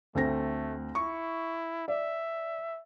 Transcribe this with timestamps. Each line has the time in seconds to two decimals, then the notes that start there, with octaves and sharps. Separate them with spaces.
0.15 D2 A3 C4 A#6
0.95 E4 C#6
1.88 D5 E5